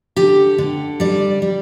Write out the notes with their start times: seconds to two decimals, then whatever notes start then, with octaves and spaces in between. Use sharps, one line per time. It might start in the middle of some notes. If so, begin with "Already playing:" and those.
0.16 D3 G4
0.58 D3
1.00 G3 D5
1.42 G3